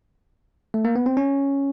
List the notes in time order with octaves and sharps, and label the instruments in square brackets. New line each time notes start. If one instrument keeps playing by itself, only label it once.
[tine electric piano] A3
A#3
B3
C4
C#4